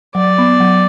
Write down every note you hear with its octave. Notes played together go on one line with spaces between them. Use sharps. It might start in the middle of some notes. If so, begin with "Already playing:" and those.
F#3 D5
B3
F#3